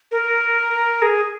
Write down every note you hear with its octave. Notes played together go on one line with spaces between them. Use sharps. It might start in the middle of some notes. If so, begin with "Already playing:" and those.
A#4
G#4